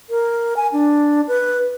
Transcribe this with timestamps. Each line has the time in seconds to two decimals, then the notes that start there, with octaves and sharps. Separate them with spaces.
0.10 A#4
0.57 G#5
0.72 D4
1.28 B4